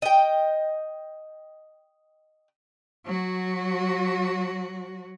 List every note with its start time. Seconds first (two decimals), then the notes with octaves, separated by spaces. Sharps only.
0.02 D#5 G5
3.05 F#3 F#4